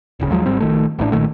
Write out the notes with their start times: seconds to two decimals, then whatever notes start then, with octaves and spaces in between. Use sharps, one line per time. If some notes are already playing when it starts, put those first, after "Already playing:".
0.20 D1 G1 C#3
0.31 D#2 F3 F#3 G#3
0.46 G#1 G#2 G3 C4
0.60 A#1 D#3 A3
0.99 A1 A2 D#3 D4
1.12 B1 A#2 D#3 A3